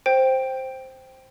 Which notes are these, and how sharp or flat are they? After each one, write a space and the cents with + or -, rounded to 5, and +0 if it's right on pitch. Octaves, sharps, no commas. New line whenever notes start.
C5 +0 G5 +0